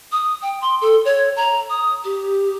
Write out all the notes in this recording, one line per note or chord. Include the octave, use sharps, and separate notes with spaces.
D#6
G5
C6
A4
C#5
A#5
D#6
G4